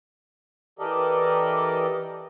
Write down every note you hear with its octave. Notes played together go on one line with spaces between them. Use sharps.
E3 G4 A4 A#4 D5 D#5